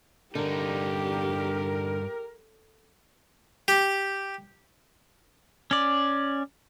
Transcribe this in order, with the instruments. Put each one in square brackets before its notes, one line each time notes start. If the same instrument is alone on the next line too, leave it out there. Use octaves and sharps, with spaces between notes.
[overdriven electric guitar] G2 D#4 [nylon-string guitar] D3 [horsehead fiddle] G4 [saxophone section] A#4
[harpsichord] G4
[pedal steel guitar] C#4 D5